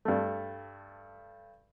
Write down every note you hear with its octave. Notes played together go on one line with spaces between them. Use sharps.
G2 A3